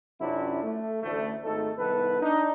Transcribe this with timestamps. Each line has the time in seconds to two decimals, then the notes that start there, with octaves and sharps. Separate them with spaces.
0.21 F#2 C3 C#4 D4 E4 F4
0.63 A3
1.03 A1 D2 A3
1.44 G#1 A3 D#4 A4
1.78 C2 D#3 B3 A4 B4
2.21 D4 D#4